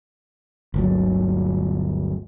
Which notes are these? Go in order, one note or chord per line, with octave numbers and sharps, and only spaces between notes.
G1 D2 F#3